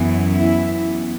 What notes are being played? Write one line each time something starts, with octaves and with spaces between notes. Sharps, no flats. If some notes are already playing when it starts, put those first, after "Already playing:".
Already playing: F#2 E3 B3
E4